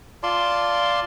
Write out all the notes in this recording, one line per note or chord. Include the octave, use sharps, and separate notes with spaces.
F4 D5 A5 C6